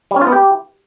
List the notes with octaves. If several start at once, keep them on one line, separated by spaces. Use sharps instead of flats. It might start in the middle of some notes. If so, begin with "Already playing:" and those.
G3
C#4
F4
B3
G4